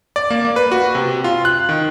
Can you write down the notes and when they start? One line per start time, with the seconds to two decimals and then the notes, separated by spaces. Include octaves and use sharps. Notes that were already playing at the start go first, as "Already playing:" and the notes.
0.16 D5
0.30 A#3
0.45 A#3
0.56 B4
0.72 F#4
0.95 C3
1.24 F4
1.45 F#6
1.69 D#3